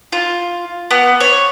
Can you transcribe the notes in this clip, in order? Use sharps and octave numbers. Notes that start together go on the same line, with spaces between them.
F4
B3
C#5